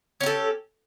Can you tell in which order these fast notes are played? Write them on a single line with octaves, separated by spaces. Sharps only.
C#4 G4 A4